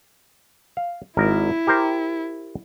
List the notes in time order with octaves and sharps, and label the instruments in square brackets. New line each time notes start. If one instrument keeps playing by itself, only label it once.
[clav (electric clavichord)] F5
[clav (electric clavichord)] G#1 A#4 [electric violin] E4
[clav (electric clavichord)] G4 A#4 C5